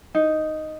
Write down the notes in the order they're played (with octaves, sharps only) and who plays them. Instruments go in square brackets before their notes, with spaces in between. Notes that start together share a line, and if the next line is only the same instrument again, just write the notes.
[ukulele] D#4